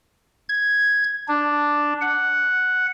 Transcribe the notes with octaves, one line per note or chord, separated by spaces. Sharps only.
G#6
D4
F#5